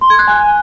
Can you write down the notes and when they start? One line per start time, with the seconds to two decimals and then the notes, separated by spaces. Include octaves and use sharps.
0.01 C6
0.10 G#6
0.19 F#6
0.28 G#5